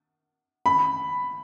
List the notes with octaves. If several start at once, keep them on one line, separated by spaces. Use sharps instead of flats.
B5